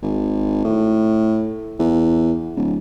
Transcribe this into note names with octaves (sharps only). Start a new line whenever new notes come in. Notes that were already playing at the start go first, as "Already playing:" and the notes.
G#1
A2
E2
D1